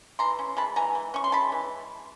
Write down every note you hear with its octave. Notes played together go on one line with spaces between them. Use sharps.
E3 A#5 C6
C#4
G#3 A5 B5
E3 G#5 A#5
E3
C#4 C#6
C6
G#3 A5 B5
E3